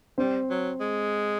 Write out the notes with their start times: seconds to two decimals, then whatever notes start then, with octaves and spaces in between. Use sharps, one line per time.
0.18 G3 C4 C5
0.50 F#3
0.80 G#3